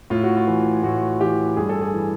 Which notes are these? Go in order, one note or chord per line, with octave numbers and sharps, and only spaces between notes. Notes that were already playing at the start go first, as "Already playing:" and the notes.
A2 F4
F#4
F4
E3
A2 F#4
E3 G4
G2 G#4
A4
G#4
E3